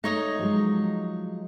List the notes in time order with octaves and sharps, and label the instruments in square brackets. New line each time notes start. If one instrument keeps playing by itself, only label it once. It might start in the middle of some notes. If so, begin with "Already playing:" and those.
[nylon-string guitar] A3 [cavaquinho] D#4 C#5 D#5
[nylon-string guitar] F3 F#3 G#3